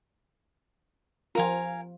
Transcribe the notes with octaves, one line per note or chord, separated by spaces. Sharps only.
F3 F4 A#4 F5 G#5